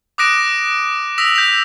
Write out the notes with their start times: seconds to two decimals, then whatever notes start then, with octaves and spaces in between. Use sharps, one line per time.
0.18 D6 D#6 F#6 A#6 D7 E7
1.18 D#6 E6 A#6 B6 F7
1.36 G6 B6 F7